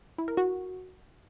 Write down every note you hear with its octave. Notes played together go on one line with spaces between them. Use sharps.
E4
A#4
F#4